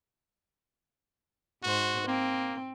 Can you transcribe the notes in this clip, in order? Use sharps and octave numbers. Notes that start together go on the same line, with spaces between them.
G#2 F#4 C5
A#3 C4